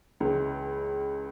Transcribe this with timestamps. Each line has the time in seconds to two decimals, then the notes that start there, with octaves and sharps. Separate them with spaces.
0.20 C#2 C#3 E3 G#3